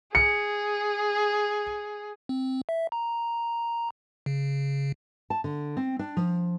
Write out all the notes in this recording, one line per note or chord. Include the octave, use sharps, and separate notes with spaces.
G#4 C#7
C4
E5
A#5
C#3
A5
D3
C4
D4
F3